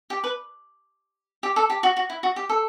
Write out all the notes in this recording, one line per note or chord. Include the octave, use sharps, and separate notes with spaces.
G4
B4
G4
A4
G4
F#4
F#4
E4
F#4
G4
A4